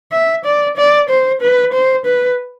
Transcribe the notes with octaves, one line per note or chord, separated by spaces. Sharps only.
E5
D5
D5
C5
B4
C5
B4